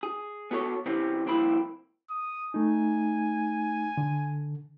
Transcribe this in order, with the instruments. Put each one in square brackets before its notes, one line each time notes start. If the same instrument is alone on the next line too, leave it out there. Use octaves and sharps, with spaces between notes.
[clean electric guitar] G#4
B3 F#4 A4 C#5
C3 E3 C4 C#4
C2 F2 A#3 C4 E4 B5
[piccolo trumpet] D#6
[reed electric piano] A3 D#4 [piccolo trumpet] G#5
[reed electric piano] D3